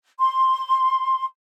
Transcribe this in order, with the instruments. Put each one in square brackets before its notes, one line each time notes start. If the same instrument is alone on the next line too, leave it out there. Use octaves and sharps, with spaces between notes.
[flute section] C6